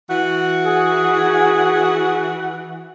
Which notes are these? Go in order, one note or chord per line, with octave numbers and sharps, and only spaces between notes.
E3 F#4 F#5
G#4